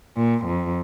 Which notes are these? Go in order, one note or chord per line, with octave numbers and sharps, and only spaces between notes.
A#2
F2